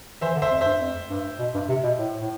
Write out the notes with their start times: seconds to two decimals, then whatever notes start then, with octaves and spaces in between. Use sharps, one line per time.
0.21 E3 C5 E5
0.36 D3
0.42 C5 E5
0.51 F2
0.61 C5 E5
0.66 G2
0.81 F2
1.10 G2
1.39 B2
1.54 G2
1.69 C3
1.84 B2
1.99 A2
2.21 A2